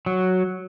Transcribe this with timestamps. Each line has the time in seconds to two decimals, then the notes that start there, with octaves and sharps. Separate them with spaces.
0.06 F#3